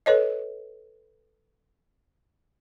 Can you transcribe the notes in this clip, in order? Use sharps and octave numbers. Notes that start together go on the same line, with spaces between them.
A4 B4 C#5 D#5